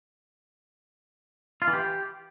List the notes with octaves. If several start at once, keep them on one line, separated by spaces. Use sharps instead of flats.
F4
E3
G4